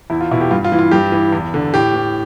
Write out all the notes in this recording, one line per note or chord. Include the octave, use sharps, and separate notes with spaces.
E2 E4
F4
B2 E4
G4
G2 F4
F4
E3
F4
G2 G4
E3
E2
D3
A2 G4
E3